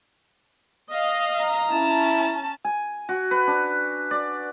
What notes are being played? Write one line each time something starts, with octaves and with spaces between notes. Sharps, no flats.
D#5 F5
A#5
C#4 E4 A5
G#5
F#4
B4
D4
D5